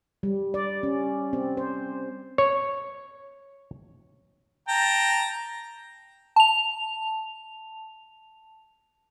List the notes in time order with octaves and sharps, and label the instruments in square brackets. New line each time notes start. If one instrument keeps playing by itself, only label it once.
[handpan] G3
D5
C#4
C4
C5
[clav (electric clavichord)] C#5
[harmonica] G5 A5 A#5
[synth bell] A5 F7